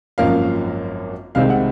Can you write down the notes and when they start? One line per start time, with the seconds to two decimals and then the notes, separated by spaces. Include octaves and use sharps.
0.18 G#1 F#2 F3 A#3 C#4 F5
1.35 C2 C3 D#3 G#3 C4 F5
1.50 F#5